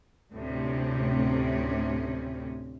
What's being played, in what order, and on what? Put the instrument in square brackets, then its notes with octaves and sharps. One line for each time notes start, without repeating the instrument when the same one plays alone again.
[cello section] D2 A2 C3 C#4